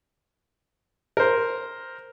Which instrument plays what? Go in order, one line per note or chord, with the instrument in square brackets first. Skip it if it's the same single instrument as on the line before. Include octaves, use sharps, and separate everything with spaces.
[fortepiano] A#4 C5